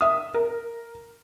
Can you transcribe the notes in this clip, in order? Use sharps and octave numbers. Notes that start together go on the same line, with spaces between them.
E5 D#6
A#4